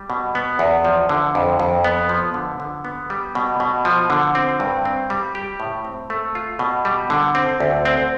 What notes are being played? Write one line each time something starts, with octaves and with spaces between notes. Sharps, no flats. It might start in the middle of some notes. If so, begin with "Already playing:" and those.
Already playing: G3
B2
B3
E2
F3
D3
F2
F2
B3
F3
D3
D3
B3
G3
B2
B2
F3
D3
C4
G2
C4
G3
G4
A2
C4
A3
F4
B2
G3
D3
C4
D2
C4